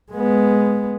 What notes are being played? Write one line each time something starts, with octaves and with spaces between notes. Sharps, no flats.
G#3 B3